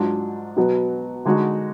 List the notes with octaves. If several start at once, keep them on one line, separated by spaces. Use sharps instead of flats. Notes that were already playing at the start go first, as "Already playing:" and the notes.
Already playing: G#2 F#3 D4 F4
B2 F#3 B3
D3 G#3 D#4 F#4